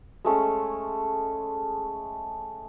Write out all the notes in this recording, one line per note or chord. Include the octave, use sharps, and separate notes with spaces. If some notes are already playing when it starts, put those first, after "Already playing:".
G#3 A3 C#4